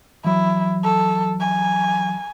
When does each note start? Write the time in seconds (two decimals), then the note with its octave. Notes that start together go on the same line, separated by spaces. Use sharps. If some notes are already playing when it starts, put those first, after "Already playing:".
0.25 E3 F#3 E4
0.84 A4
1.41 G#5